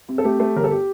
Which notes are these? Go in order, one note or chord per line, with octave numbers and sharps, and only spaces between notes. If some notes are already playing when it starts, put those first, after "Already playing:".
C3
A4
A3 G4
A3
G1 A#4
A4
G4